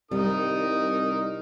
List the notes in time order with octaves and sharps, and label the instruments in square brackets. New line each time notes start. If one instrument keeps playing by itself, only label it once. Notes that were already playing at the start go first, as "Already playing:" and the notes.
[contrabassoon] C2 [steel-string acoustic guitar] G3 [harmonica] D#4 A#4 D#6